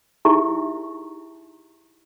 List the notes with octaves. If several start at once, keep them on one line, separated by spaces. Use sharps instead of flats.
D#4 E4 G4 G#4 E5 C#6